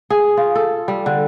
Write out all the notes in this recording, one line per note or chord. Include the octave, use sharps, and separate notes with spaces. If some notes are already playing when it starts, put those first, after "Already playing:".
G#4
F4
A4
G3
D3